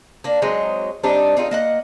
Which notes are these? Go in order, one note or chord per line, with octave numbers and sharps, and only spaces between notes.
A#3 D4
F#3 G#3 C4 D#4
G3 C4 D4 D#4
C4 D#4 F4 G#4
A#3 D#5 F#5